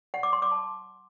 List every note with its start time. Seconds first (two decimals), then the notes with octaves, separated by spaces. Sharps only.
0.14 F#5
0.23 D6
0.33 C6
0.42 D6
0.52 A5